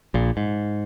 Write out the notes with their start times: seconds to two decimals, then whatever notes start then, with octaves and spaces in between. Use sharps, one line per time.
0.14 A#1 A#2
0.37 G#2